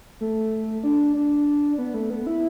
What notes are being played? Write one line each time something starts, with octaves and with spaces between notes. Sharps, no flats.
A3
D4
D4
B3
A3
B3
E4